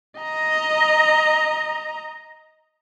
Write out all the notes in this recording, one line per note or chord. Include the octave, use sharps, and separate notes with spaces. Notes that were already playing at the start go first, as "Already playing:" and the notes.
D#5 A#5